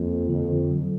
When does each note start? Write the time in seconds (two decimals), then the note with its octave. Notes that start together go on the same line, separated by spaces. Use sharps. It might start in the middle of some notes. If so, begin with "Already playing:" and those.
Already playing: F2 A#3
0.29 F2 D3
0.71 F#3